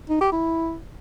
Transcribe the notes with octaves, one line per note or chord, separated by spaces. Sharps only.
D#4
G4
E4